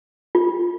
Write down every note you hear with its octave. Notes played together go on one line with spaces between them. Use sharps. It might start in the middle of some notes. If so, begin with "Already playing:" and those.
F4